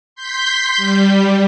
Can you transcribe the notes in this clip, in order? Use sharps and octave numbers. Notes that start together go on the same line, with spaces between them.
C6 G6 B6
G3